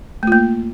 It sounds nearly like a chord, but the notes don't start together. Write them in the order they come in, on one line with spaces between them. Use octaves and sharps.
A3 F4 A#3